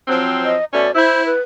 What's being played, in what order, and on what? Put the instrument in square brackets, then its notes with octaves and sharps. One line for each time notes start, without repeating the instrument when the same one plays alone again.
[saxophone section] F3 F#3 C4
[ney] D#5
[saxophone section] B2 A3 C#4 [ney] D5
[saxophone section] E4 [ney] C5
[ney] B4